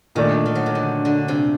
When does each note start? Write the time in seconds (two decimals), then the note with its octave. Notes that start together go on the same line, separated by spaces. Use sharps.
0.15 A#2 D#3 A3 D4
0.46 D#3
0.55 F#3
0.66 D#3
0.75 D3
1.05 D3
1.28 C3